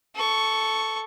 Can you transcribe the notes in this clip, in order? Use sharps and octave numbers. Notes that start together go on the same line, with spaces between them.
A4 C#6